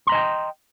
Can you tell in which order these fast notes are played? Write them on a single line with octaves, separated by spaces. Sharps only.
C6 A#5 D#5 G#5 G5